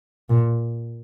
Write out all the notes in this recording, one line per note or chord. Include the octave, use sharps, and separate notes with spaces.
A#2